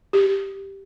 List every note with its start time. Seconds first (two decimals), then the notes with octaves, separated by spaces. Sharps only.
0.13 G4